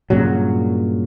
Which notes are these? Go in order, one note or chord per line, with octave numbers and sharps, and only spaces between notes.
G2 A#2 C#3 F#3